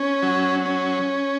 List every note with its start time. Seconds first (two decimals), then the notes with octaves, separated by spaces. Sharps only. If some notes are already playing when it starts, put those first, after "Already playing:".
Already playing: C#4
0.23 F#3
0.65 C#4